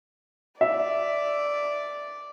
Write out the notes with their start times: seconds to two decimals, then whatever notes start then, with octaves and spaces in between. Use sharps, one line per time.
0.61 D5 E5